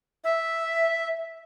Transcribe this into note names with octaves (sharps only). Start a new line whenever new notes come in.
E5